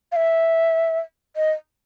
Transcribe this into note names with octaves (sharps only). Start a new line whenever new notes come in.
F5
E5
D#5